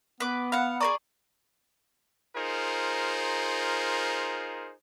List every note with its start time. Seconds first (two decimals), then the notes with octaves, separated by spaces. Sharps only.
0.20 B3 B4 D6
0.52 F5 F#5 B5
0.80 G#4 A#4 D5 A#5 C#6
2.36 D#4 F4 G#4 A#4 C5